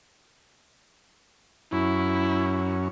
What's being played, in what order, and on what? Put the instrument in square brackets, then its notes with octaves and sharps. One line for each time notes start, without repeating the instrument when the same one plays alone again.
[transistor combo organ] F#2 C#4 [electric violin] E4